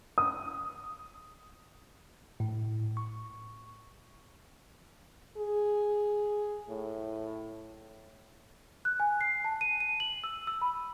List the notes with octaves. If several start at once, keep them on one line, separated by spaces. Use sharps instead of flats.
D#6
A2
C#6
G#4
A2
F#6
G#5
C7
A5
D#7
D#7
F#7
E6
E6
B5